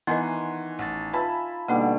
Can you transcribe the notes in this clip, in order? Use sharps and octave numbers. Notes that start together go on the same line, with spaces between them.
D#3 E3 B3 A#4 D#5 F#5 G#5 C6
A1 F#5 A6
F4 B4 E5 G#5 A5 B5
B2 D3 G3 A#3 D#4